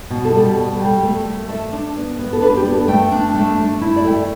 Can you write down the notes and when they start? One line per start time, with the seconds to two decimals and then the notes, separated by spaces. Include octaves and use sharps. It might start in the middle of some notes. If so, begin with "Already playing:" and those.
0.10 B2
0.25 A4
0.33 G3
0.40 A4
0.57 B2
0.80 G3
1.03 A3
1.25 A3
1.48 A3 E5
1.73 D4
1.96 B3
2.19 B3
2.33 A4
2.42 D4 B4
2.57 G4
2.65 B3
2.73 A4
2.88 A3 G5
3.12 D4
3.35 A3
3.58 A3
3.81 E4 E5
3.96 D5
4.04 A3 G5
4.12 E5